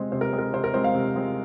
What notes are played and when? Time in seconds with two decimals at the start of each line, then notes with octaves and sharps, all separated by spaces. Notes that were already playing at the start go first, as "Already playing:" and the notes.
Already playing: C3 G#3 C4 C5
0.12 C3 C5
0.21 A#4
0.33 G#3 C4
0.39 A#4
0.53 C3 C5
0.64 A#4
0.74 G#3 C4 C5
0.84 F5
0.95 C3
1.16 G#3 C4